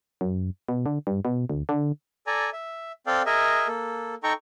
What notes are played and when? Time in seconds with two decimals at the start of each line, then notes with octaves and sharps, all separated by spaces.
0.21 F#2
0.69 B2
0.86 D3
1.07 G2
1.25 B2
1.50 D2
1.69 D3
2.27 A4 D5 G#5 A#5
2.53 E5
3.07 C4 A4 D5 F5 G5
3.26 G#4 A#4 D#5 E5
3.68 A#3 A4
4.23 D#4 A4 G5 A#5 C#6